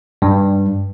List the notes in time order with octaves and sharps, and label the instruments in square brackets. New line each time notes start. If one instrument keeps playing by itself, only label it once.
[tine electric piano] G2